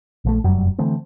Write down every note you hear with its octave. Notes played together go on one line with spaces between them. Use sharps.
A#1 E3 A3
F1 F#2 F#3 G3
D3 E3 A3 C4